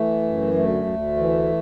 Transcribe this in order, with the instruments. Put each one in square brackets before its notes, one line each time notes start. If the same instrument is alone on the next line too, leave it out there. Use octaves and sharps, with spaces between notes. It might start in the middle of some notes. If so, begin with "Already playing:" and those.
Already playing: [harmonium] E3 A3
F#2
D2 A3
D2
E3